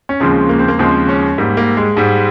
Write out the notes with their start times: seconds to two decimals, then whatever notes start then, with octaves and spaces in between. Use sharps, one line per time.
0.09 C#4
0.20 D#2 C#3 F3 G#3 C4
0.49 A#3
0.59 C4
0.68 A#3
0.79 D#2 C#3 F3 G#3 C4
1.09 C#4
1.38 G#2 G3 A#3
1.57 A#3
1.77 G#3
1.97 G#2 G3